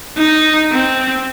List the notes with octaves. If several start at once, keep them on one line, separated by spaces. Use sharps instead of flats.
D#4
C4